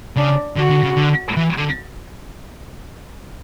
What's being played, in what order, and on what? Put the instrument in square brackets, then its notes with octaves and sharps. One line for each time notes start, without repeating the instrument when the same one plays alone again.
[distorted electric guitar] C#3 [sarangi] D4
[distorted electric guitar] D3 [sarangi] F#4
[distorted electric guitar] D3
C#3
D3
E3
D3